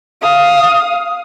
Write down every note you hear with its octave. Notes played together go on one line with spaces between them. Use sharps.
F5 D#6